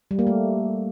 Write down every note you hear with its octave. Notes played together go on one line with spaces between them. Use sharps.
G3
A#3
A3